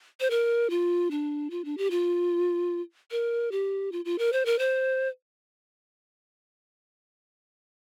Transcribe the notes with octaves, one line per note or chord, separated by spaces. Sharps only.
C5
A#4
F4
D4
F4
D4
G4
F4
A#4
G4
F4
F4
A#4
C5
A#4
C5